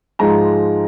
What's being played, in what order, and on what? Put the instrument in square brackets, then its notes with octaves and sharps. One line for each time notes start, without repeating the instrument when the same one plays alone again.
[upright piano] G#2 F3 G#3 A#5